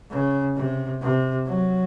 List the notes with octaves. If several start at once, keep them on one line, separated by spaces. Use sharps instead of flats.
C#3
C3
C3
F#3